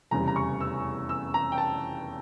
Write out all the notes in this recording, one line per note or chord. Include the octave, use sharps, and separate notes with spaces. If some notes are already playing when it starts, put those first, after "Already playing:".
F1 E2 C#3 G3 A#5
A#5
C#6
E6
E6
A#5
G5
A5